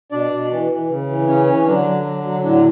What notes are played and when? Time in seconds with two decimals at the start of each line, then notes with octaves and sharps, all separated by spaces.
0.12 B2 D4 D5
0.31 B2
0.51 E3
0.71 E3
0.89 C#3
1.08 E3
1.28 C#3 C#4 C#5
1.47 E3
1.66 D3 F#3 D4
1.86 F#3
2.05 F#3
2.24 F#3
2.43 A2 D3 D4